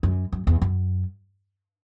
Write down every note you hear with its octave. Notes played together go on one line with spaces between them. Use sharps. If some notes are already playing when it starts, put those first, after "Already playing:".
F#2
F#2
E2
F#2